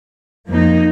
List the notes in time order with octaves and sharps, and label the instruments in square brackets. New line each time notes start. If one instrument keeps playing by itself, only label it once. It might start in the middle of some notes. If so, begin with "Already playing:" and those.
[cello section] F2 F3 A#3 D#4